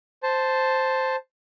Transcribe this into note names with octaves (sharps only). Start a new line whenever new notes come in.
C5 A5